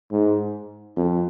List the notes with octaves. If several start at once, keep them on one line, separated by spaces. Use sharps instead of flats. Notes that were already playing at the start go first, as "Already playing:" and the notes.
G#2
F2